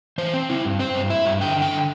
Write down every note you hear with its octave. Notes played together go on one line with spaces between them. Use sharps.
E3 C5
C4
E4
G2
C4 C5
G2
E4 E5
G2
D3 G5
D3
G5
D3